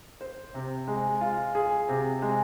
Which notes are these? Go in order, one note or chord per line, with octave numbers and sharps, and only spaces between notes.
C5
C3
G#3
F4
G#4
C3
G#3